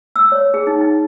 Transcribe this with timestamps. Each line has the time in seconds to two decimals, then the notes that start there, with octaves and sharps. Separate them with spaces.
0.16 E6
0.32 C#5
0.54 G#4
0.67 D#4
0.81 D#4